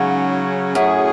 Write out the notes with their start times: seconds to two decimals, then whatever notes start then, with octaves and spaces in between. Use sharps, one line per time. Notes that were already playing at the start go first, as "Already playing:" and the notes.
Already playing: G#2 C#3 F#3 C#4
0.75 F#2 A2 F#3 C#4 G#4